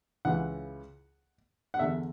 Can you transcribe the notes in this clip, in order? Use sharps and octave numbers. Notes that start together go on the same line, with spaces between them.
C#2 C#3 E3 F#5
F#5
E2 D3 E5